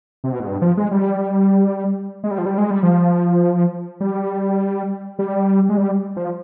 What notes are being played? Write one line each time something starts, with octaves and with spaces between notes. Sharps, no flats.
C3
B2
G#2
G2
F3
G#3
G3
G#3
G3
F3
G3
G#3
G3
F3
G3
G3
G#3
G3
F3